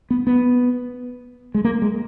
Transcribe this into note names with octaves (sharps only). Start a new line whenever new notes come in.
B3
B3
G#3
A#3
G#3